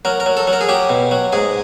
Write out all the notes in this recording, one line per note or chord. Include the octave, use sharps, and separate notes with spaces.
F#3 A#4
A#4
F#3
A4
F#3
A#4
G#4
F#3 G4
B2
F#3
G#2 G#4